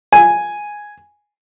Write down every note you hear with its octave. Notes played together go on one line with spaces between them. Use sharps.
G#5